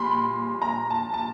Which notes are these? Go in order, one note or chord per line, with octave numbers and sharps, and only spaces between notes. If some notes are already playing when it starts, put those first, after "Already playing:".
Already playing: A#2 G3 B5 C6
A#5
A5
A5